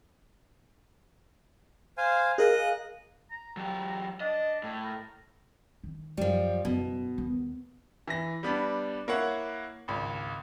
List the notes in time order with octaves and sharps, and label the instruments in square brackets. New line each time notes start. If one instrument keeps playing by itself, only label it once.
[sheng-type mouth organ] C5 F5 G#5
[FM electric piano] G#4 A#4 F5 [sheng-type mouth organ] D#5 F#6
[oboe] A#5
[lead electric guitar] F#3 G4
[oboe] D4 [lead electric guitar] D#5
[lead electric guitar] A2
[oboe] A#4
[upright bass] D#3
[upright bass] F#2 [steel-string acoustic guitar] F3 G3
[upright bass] F#1 [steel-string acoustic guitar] B2
[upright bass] D#2
[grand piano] E3 A#6
G3 B3 D4
A#3 E4 C#5 F#5
G#1 C#2